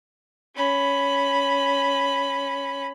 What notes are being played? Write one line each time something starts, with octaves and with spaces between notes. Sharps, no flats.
C#4 B5